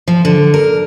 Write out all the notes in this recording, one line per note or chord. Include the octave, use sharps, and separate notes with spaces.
F3
D3
A#4